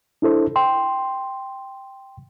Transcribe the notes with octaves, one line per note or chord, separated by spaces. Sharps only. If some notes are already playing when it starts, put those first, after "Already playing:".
D4 E4 A4 C5
G5 C6